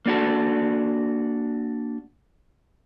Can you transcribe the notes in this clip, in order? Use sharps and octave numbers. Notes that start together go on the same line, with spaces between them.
A#3 D4 F#4 A4